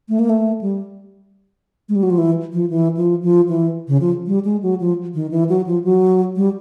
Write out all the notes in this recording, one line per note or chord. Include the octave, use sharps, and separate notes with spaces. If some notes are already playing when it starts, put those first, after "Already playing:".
A3
A#3
A3
G3
G#3
G3
F#3
F3
E3
F3
E3
F3
F3
E3
C#3
F3
G3
G#3
F#3
F3
D#3
E3
F#3
F3
F#3
G3